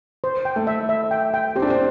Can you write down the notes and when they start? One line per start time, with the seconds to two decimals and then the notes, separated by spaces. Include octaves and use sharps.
0.24 C5
0.45 G5
0.56 A3
0.67 E5
0.89 E5
1.11 G5
1.34 G5
1.56 C4 G4
1.62 D4
1.70 C4